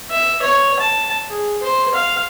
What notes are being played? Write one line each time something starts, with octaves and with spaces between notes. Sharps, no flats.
E5
C#5
A5
G#4
C5
F5